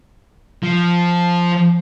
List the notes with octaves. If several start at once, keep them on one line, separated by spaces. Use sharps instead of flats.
F3